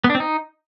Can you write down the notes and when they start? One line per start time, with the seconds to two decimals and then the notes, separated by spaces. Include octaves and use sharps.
0.04 B3
0.10 D4
0.15 C4
0.20 D#4